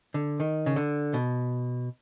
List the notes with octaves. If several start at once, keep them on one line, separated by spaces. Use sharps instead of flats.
D3
D#3
C#3
D3
B2